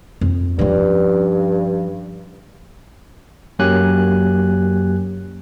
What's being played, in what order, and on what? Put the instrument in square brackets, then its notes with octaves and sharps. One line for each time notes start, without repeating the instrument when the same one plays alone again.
[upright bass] F2
[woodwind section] G2 [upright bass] F3 C#4
[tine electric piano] F#2 F#3 A#3 G4 G#5 F#6